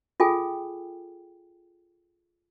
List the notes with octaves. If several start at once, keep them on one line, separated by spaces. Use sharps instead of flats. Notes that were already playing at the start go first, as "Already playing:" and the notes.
F4 G#4 A4 G5 G#5